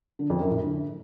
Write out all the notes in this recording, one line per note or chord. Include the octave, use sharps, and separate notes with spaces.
D3
F2
F#2
A2
D3